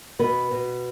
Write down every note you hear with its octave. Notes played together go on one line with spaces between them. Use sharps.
B2 B3 B4
B2